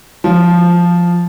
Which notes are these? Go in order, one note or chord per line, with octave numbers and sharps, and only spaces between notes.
F3